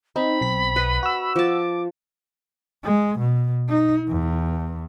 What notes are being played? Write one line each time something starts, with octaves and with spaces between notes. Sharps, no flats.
C4 D#4 B5
B1 B6
B4 D#5 F#5
F#4 E6
F3 A5 D6
G#3
B2
D#4
E2